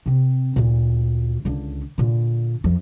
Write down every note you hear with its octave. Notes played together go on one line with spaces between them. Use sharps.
C3 C4
D2 A#2
C#2 D3
A#2 D3
F2 F3